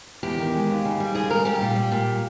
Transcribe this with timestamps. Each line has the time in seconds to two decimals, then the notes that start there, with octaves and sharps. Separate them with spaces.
0.23 E2 G4
0.38 D#3
0.54 G#3
0.70 D#2
0.85 C#3
1.00 G3
1.15 D#2 G#4
1.30 C#3 A#4
1.45 G3 G4
1.61 A#2
1.76 G3
1.92 A#2